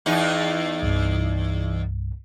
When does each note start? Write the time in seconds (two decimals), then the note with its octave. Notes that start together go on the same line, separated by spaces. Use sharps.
0.06 E2 D#4
0.83 C2 G2